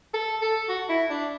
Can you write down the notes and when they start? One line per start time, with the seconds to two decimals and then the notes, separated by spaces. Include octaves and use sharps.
0.14 A4
0.42 A4
0.69 F#4
0.89 E4
1.10 D4